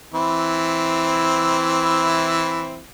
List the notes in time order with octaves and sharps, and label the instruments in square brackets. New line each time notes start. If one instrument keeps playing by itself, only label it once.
[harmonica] E3 C4 E4